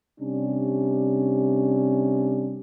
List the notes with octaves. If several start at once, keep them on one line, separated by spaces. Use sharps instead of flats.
C3 G3 C#4 D4